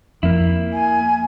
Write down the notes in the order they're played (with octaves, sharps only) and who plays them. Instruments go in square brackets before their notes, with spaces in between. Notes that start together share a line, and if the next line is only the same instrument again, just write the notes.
[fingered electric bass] F2 [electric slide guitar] A#3 E4
[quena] G#5